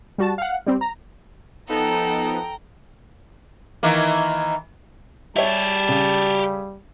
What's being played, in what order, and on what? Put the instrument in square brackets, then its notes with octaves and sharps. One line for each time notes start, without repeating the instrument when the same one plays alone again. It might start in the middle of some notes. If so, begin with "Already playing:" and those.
[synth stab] G3 F#4 A5
F5 F#5
G3 C4
A#5
[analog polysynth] F3 B3 D#4 [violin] A4 [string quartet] G5 A#5
[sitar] D#3 E3 A#3
[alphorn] G3 [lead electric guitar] G4 G#4 [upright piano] C#5 E5 [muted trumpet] A5
[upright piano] C#3